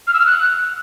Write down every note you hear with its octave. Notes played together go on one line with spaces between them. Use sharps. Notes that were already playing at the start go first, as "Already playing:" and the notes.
F6
E6
F6
F#6